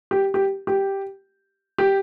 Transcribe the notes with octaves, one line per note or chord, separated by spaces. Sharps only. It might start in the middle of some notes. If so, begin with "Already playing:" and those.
G4
G4
G4
G4